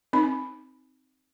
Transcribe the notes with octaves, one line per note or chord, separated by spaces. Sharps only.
C4 D#4 B5